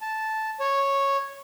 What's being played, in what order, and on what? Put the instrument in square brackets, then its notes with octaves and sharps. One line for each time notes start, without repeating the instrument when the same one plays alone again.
[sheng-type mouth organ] A5
C#5